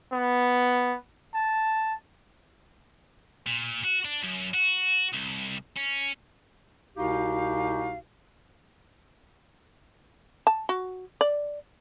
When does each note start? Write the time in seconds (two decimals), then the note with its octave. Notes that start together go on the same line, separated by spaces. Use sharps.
0.12 B3
1.34 A5
3.47 A#2
3.84 F#4
4.05 D4
4.24 F#2
4.54 F#4
5.13 C2
5.76 C#4
6.97 C2 B2 D#4 F#4 G4 F5
10.47 A5
10.69 F#4
11.21 D5